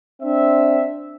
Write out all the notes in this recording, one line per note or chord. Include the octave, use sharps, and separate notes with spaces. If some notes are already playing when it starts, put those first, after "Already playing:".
C4 D4 E5